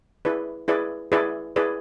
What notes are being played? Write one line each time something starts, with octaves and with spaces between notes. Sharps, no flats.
E4 G#4 B4 D5
E4 G#4 B4 D5
E4 G#4 B4 D5
E4 G#4 B4 D5